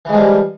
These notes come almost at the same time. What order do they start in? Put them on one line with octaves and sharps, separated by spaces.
E3 G#3 F3 G3